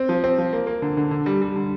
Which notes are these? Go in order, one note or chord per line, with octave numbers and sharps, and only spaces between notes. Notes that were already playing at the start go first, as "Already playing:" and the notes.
Already playing: C4
F3
C4
F3
A#3
A#3
D3
D3
D3
G3
G3
D3